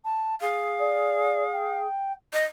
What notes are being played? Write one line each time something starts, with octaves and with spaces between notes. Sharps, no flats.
A5
G#4 F5
D5
G5
D#5